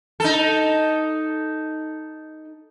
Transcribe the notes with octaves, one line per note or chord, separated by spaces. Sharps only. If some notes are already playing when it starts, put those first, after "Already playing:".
D#4 A4